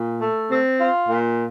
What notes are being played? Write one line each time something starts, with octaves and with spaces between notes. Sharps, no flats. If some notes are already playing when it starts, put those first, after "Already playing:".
Already playing: A#2
A3
C4
F4
A#2